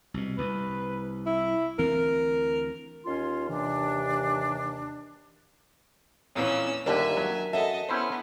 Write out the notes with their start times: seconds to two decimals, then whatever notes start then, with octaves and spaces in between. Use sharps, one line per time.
0.14 C2 B2
0.38 C2 B4
1.26 E4
1.79 D2 E3 C4 A#4
3.05 D#2 C#4 F4 C6
3.49 D#2 C3 E3 D4
6.35 F2 A#2 E3 C#4 C#5 E6
6.86 G1 D#2 D3 D4 A#4 E5 G#5
7.17 F#3
7.53 F#2 A4 D#5 E5 A5
7.89 B3 C#4 E4 C5